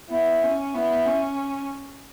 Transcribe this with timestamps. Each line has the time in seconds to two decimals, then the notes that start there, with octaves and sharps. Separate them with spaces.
0.10 B3 E4
0.43 C#4
0.74 B3 E4
1.06 C#4